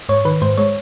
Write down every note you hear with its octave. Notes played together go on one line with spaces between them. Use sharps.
G#2 C#5
D#3 B4
G#2 C5
G#3 C#5